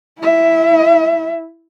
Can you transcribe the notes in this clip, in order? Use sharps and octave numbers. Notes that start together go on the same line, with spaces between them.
E4 E5